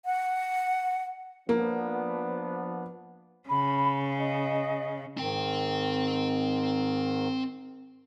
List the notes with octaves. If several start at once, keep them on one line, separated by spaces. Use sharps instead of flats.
F#5
F3 A#3 B3 D4
C#3 B5
D#5
G#2 D#3 C4 G5